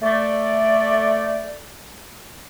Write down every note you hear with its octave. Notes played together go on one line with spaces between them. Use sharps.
A3 D5